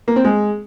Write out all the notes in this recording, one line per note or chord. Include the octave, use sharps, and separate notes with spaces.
A#3
C4
G#3